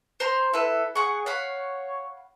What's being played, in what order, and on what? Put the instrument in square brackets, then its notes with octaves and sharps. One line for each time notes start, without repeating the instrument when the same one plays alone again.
[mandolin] C5 A#5 C6
[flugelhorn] E4 [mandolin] A4 B4
[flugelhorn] G#4 [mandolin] F#5 C#6
[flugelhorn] C#5 [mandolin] F5 F#5 B5